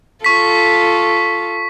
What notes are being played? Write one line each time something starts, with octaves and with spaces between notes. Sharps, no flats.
F4 A4 C#6 B6